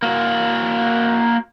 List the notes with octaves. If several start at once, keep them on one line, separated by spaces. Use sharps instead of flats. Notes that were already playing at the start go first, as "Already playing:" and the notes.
A#3 F#4